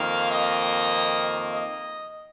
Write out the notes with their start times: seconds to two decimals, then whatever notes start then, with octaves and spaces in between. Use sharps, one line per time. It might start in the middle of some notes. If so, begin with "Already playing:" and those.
Already playing: F2 D#3 A#3 F5
0.32 D#5
1.54 D#5